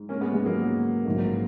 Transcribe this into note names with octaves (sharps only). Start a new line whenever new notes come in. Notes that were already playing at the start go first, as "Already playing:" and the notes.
Already playing: G#2
A#3 C#4
G#3 B3
G#3 B3
F#3 A#3
A#1 G#2 F#3 A#3